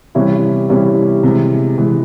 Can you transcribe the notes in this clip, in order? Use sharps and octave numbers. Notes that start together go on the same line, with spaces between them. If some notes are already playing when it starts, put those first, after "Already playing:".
C3 E3 G3 C#4 E4
C3 E3 G3 C#4 E4
C3 E3 G#3
C3 E3 G#3